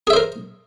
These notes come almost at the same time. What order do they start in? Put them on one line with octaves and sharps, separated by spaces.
G#4 E5 C5 A#4